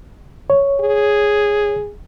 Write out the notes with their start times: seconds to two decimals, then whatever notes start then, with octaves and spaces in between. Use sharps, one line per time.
0.50 C#5
0.81 G#4